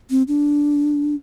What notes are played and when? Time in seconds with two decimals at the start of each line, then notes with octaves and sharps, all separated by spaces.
0.10 C4
0.28 D4